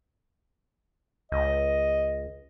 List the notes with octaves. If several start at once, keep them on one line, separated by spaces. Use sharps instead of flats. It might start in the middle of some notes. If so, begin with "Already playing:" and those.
C#2 D#5